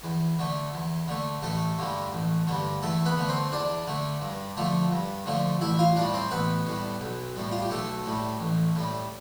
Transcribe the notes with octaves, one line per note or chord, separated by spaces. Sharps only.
E2
D3 A3
E2
D3 A3
A1 A3 A4
G2 D3 G3
A1
G2 D3 G3
E2 A3 A4
B3 B4
D3 A3
C4 C5
E2 D4 D5
D3 A3
G2
D3 F3 A3
G2
D3 F3 A3
A1 E4 E5
F4 F5
A2 G3 D4 D5
C4 C5
A1 B3 B4
A2 G3
B1
A2 G3
F4
G4
B1 A3 A4
A2 G3
A1
A2 G3